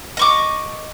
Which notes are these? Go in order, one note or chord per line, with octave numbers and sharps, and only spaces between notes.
D#5 C#6 D6